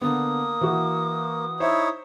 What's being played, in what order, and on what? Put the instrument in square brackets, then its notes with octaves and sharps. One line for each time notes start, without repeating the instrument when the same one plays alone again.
[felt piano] D3 B3 [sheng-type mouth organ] A#3 [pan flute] D#6
[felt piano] E3 F#4
[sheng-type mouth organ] D#4 E4 C#5 [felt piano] C5 E5